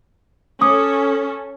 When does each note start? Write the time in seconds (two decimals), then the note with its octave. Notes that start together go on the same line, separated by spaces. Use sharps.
0.61 C#4 A4 D6 D#6